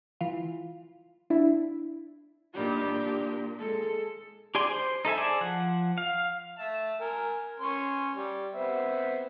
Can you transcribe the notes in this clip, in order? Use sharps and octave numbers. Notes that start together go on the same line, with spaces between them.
E3 F4
D4 E4
A#2 D#3 G3 D4 G4
A#2
G#3 A4
G4 G#4 D5 G#5 C6
C5
D#4 A4 E5 G#5
G#4 C5 D5 G#5 A5
F3 F#5
F5
E5 A5
A#4 G#5
C#4 C6
G3
B3 C4 E5